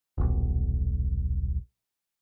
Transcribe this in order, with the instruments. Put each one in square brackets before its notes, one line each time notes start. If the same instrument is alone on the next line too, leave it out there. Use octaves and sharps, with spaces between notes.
[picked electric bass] D#1 B1